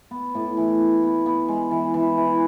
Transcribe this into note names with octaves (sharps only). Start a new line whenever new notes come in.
B3
A2
E3
B3
B3
B3
G#3
E3
E3
E3